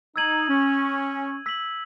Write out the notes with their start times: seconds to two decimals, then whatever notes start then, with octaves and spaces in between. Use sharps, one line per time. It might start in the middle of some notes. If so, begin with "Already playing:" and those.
0.16 D#4 E6 G#6 D#7 F#7
0.48 C#4
1.46 E6 B6 F#7